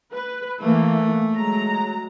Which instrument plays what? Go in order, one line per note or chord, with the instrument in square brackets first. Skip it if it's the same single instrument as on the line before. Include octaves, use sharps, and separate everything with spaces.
[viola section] B4
[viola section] E3 A#3 [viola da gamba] A3
[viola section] F#3 G#3 A#5